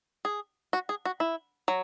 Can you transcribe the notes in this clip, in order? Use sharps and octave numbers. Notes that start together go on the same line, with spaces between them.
G#4
F#4
G#4
F#4
E4
F#3